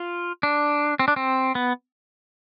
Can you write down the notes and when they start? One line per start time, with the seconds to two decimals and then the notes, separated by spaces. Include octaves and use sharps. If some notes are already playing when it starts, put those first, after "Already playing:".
Already playing: F4
0.43 D4
0.99 C4
1.08 D4
1.16 C4
1.55 B3